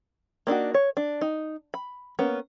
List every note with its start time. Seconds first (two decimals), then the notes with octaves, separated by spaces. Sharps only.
0.47 A#3 D4 D#4 F#4
0.74 C#5
0.97 D4
1.21 D#4
1.74 B5
2.19 A#3 B3 C#4